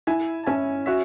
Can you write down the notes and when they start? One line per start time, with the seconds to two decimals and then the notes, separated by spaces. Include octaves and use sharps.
0.07 E4 E5 G#5
0.43 A5
0.46 C#4 E5 G#5
0.86 F#4 C#5 E5